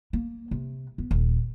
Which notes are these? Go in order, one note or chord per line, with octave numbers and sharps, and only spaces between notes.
A#3
C3
B3
D#1